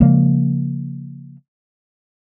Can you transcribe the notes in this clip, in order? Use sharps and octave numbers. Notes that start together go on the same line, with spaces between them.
C#3 F3 G#3 A#3